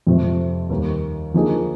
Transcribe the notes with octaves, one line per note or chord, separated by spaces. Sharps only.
F2 C3 F3 A3 C4
D#2 D#3 G3
D3 F3 A#3 D#4 G#4